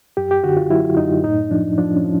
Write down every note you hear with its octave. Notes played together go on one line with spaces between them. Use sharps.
F#2 G4
G4
D3 F#4
F4
F#3 E4
F#2 D#4
A2 D#4
F3 D4
F3 D4
C#4
F3